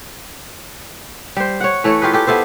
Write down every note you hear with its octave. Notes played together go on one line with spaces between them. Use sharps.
G3 C5
C#5 F#5
E3 A3 C#5
F4 G4 G#4 B4
G4 A4
B3 E4 A4 C5